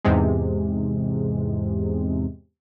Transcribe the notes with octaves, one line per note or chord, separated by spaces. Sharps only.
E2 G#2 C3 G#3